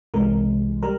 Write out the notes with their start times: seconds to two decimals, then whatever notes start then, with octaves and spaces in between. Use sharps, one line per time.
0.14 C2 C3 E3 G#3 A#4
0.83 G3 A#4